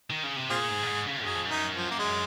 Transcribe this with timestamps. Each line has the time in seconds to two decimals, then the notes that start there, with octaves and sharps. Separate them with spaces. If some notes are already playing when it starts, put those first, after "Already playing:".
0.10 D#3
0.24 C#3
0.37 C3
0.50 A#2 C4 F4 G#4
0.69 G#2
0.83 A#2
0.87 G#2
1.07 C#3
1.25 F#2 G#4
1.35 F2
1.45 F#2 D#4
1.75 F3
1.91 A#3
1.99 G#3